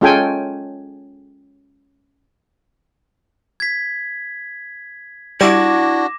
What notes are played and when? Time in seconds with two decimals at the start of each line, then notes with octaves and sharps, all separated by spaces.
0.01 G#3 C#4 F4 A4 G5 G#5
3.60 G#6 B6
5.41 G3 D4 E4 F#4 E5 D6 A#6 E7